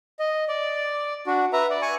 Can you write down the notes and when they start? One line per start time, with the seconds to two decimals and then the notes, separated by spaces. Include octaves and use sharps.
0.19 D#5
0.49 D5
1.27 D4 F#4
1.53 B4 E5 A#5
1.70 D5
1.82 G#5 C#6